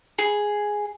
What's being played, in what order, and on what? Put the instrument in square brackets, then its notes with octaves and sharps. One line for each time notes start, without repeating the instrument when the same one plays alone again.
[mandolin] G#4